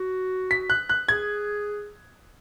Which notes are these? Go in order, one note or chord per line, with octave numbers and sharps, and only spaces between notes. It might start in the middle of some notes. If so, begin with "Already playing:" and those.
Already playing: F#4
B6
F#6
F#6
G#4 G#6